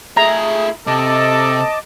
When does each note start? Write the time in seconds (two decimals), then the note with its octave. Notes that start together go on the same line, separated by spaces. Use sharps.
0.17 A3 F4 G#4 E5 A#5
0.87 C3 A4 D#5 A5 D6